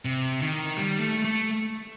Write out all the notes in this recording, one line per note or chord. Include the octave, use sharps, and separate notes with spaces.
C3
D#3
G3
A3
A3